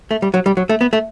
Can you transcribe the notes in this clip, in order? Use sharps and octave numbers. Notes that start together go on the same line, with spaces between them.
A3
G3
F#3
G3
F#3
A3
B3
A3